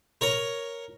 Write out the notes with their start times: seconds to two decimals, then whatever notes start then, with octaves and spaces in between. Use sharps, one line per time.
0.21 A#4 C#5 A#5